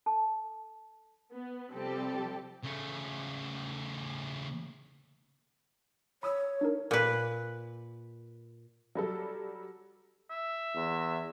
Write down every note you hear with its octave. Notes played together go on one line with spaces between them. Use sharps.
A4 A5
B3
C3 F3 G3 C4 G4 A4
C#3 A3
C#5 B5 D#6 E6
D4 D#4 A#4
A#2 B4
F#3 G3 A4
E5
E2